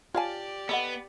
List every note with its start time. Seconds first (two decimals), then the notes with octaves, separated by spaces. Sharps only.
0.15 F4 G4 C#5 D5 F5 G#5 A5
0.69 B3 A4 D#5 F#5